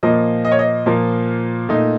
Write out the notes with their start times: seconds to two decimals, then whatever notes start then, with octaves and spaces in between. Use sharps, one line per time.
0.03 A#2 F3 A#3 D#5
0.45 D#5
0.52 C#5
0.59 D#5
0.86 A#2 F3 A#3
1.69 A#2 A3 D#4